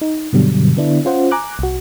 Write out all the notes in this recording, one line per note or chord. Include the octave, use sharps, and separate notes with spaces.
D#4
G2 B2 D3 F#3 G3
D3 B3 D4 E4
C#4 F4 C5 F#5
G#5 A#5 D6 F#6
C2 F#4